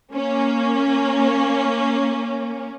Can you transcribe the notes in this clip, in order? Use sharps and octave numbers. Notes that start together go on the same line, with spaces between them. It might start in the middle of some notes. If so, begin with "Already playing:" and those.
A#3 C#4